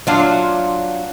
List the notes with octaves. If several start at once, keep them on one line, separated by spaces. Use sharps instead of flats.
F#3 D4 F4